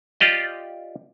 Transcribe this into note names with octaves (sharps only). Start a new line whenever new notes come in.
F4 G4 D5 D#5